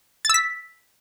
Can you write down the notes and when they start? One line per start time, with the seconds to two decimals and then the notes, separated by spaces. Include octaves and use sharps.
0.25 A6
0.29 E6
0.34 B6